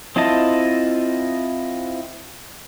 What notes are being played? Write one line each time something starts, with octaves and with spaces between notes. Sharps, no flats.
C4 E4 F4 D#5 A5